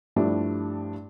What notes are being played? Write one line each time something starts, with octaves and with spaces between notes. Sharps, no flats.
G2 F3 G3 A3 D4 E4